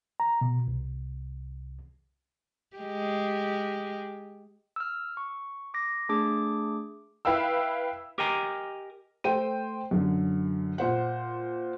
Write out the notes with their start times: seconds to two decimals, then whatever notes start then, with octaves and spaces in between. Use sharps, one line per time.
0.20 A#5
0.41 B2
0.68 C2
2.77 G#3 G4
4.76 E6 F6
5.17 C#6
5.74 D6 A#6
6.09 A3 D4 G#4 D6
7.25 E4 B4 F5 G5 E6
8.18 G4 A#4 D#5 G5 G#5 A#5
9.24 A3 C5 G5 D#7
9.91 F#2 D3
10.78 A#2 C5 F#5